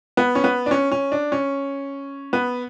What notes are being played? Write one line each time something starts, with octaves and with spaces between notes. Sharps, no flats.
B3
C#4
B3
D4
C#4
C#4
D4
C#4
B3